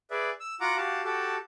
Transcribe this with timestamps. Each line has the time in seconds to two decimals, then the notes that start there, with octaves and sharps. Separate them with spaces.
0.11 G#4 B4 D5 E5
0.40 E6
0.60 F4 F#4 F#5 A#5 D6
0.77 F#4 G4 F5 A5
1.04 F#4 G4 A4 A5